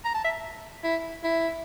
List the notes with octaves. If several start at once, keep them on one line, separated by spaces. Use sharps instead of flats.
A#5
A5
E5
E4
E4